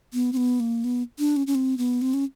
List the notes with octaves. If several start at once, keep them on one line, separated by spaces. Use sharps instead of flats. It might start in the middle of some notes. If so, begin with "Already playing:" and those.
B3
C4
B3
A#3
B3
D4
C#4
C#4
C4
B3
C4
C#4